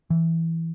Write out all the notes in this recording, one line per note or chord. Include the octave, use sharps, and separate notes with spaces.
E3